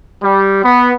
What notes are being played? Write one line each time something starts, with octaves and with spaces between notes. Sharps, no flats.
G3
B3